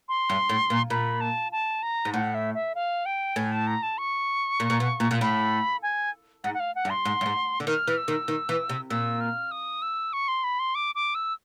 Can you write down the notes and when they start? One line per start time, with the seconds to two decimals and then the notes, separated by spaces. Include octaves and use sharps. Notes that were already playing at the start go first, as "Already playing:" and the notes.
0.09 C6
0.29 G2
0.49 A2
0.70 A#2
0.90 A#2 B5
1.21 A5
1.52 A5
1.83 A#5
2.05 G#2
2.14 A2 F#5
2.34 E5
2.54 E5
2.75 F5
3.06 G5
3.36 A2 G#5
3.52 A5
3.67 A#5
3.83 A5
3.98 C#6
4.60 A#2
4.70 A#2
4.80 B2
5.00 A#2
5.11 A#2
5.21 A2 B5
5.83 G#5
6.44 G#2 F#5
6.54 F#5
6.60 F5
6.75 F#5
6.85 G2
6.90 C6
7.05 G#2
7.21 G2
7.26 G#2
7.60 D3
7.67 D#3 F6
7.87 E3
7.98 E6
8.08 D#3
8.28 D#3
8.49 E3
8.69 C3
8.90 A#2 E6
9.20 F6
9.51 D#6
9.82 E6
10.13 C#6
10.28 C6
10.44 B5
10.59 C6
10.75 D6
10.95 D6
11.15 E6